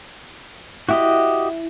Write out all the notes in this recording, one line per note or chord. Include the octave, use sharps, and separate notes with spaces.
E4 F#4 G4 D#5